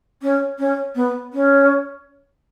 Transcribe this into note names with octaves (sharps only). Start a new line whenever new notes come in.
C#4
C#4
B3
C#4